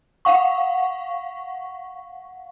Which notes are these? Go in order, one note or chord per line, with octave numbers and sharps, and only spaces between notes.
F5 F#5 C#6